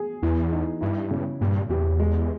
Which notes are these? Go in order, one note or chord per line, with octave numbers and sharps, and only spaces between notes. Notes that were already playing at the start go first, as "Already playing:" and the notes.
Already playing: G#4
E2 E3
D#4
G2 E4
C#3
G2 A#2
E2 G4
G#3